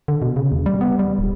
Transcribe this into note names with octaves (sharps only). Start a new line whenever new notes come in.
D3
B2
C#3
D#2
G3
B3
G3
D1